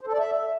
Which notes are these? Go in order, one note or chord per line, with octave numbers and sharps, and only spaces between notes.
C5
A4
D5
E5